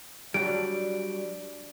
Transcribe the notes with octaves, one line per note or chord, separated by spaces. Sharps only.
F#3 G3 D4 D7